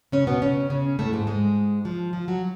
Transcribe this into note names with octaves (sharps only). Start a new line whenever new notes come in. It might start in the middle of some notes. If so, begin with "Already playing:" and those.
C#3 C#4
B2 B3
C#3 C#4
C#3 C#4
A2 A3
G#2 G#3
G#2 G#3
F3
F3
F#3